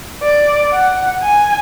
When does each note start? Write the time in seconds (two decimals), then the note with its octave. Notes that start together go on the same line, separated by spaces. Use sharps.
0.23 D5
0.72 F#5
1.22 G#5